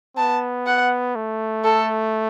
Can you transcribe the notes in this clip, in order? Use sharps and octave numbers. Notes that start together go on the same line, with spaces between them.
B3 A5
F#5
A3
A4